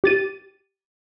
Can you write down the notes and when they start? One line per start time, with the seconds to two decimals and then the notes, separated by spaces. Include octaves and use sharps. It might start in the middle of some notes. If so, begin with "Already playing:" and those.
0.04 G4 A6 D#7